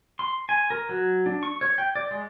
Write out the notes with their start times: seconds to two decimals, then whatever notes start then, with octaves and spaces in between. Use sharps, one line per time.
0.19 C6
0.49 G#5
0.70 A#4
0.89 F#3
1.26 D4
1.43 C#6
1.61 C#5
1.78 G5
1.95 D5
2.11 G#3